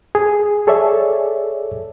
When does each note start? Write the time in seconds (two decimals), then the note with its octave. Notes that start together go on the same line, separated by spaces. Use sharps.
0.15 G#4
0.67 G#4 A4 C#5 D5 E5